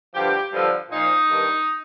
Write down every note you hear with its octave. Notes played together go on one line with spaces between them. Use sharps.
G2 D3 F3 G4
G2 D3 F3
A#2 F3 D#4
G2 D#3